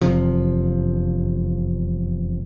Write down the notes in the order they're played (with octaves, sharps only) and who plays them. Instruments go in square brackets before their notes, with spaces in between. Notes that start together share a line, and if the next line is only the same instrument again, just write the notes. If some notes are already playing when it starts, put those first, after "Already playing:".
[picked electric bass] E1 F2 C3 F3